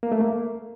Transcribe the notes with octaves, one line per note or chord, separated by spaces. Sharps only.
A#3
A3
A#3